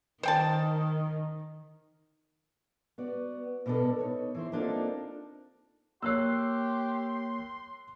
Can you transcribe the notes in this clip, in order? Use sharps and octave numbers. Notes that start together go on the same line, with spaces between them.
D#3 C5 G5 A5
B3 F#4 D5
B2 B3 D4 G4 A4 A#4
D#4 C#5
E3 E4 C5
A#3 C4 D4 D#4 F4 A4
A#3 G4 A#4 C#5 C6 E6 F#6 C7